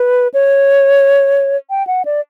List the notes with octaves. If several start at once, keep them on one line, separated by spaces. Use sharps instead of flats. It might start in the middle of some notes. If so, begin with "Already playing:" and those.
Already playing: B4
C#5
G5
F#5
D5